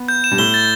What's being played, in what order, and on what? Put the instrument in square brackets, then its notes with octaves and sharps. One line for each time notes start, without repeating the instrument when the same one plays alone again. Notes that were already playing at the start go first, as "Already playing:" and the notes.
Already playing: [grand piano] B3
[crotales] G6
E7
[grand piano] G2
[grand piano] A2 [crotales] G7
[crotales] A6